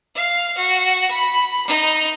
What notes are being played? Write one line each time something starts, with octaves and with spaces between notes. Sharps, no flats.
F5
F#4
B5
D#4